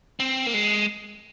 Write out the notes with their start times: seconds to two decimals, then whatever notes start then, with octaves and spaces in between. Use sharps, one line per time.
0.20 C4
0.46 A#3
0.54 G#3